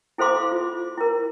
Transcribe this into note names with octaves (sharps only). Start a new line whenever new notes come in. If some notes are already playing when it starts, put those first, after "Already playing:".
E4 A4 C5 F5 C6 D6
F4
E4 A#4